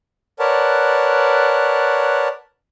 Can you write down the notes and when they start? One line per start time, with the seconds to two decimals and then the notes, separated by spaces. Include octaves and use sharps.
0.39 A#4 B4 C#5 D5 F#5 A5